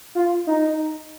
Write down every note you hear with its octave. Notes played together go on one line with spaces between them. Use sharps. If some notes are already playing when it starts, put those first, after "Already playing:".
F4
D#4